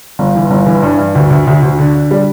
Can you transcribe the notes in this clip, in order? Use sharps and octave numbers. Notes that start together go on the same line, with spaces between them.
G1
E3
G1
E3
G2
G2
D2
D2
D2
D2
D3
D3
G3